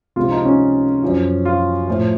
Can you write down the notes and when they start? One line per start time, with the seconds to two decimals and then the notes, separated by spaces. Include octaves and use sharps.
0.16 C#2 C3 F3 F4
0.31 D#4
0.45 C#4
1.03 F#2 F3
1.45 F4
1.88 A2 F3